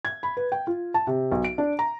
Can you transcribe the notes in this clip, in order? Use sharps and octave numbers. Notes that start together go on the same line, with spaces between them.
G#6
B5
B4
G5
F4
A5
C3
B1
D7
D4
A#5